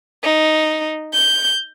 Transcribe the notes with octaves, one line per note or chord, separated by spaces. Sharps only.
D#4
G6